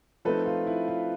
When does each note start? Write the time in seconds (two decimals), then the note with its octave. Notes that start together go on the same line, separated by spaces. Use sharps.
0.25 F3 A3 C4 D#4 A4 B4
0.46 F4
0.67 E4
0.88 F4